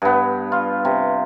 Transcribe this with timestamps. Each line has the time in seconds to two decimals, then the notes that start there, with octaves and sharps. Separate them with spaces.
0.02 G2 B3
0.52 F4
0.85 C3